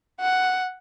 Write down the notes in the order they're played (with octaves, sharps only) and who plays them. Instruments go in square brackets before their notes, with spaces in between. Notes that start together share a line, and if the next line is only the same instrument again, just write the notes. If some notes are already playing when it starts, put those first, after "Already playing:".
[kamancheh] F#5